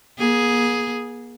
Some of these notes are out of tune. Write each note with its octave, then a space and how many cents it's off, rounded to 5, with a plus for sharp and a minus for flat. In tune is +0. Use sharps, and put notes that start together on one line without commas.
A#3 +45 G#4 +0